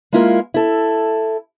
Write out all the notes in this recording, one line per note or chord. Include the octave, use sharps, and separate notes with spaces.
G#3 A#3 E4 F4 G4 A#4
E4 A4